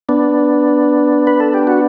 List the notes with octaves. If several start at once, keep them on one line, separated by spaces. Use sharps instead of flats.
B3 D4
B4
A4
G4
F#4